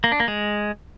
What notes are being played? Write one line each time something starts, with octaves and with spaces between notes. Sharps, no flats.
A#3
D4
A#3
G#3